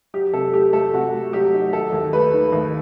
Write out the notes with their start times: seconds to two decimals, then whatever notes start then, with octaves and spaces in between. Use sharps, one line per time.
0.14 F#3 G4
0.33 C3 A4
0.53 A3 G4
0.73 A3 A4
0.93 C3 F#4
1.13 A3
1.33 F#3 G4
1.53 D#4
1.73 D#3 A4
1.92 D#2
2.13 A3 B4
2.33 D#3
2.52 D#2